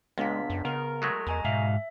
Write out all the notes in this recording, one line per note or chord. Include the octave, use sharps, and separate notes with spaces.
C#2 A#2 G#3 B3 D4 B6
F#2
C#3 B3 A#4
F#3 G#3 A3
E2 D#5 G#5 A#5
G#2 B2 E5 F5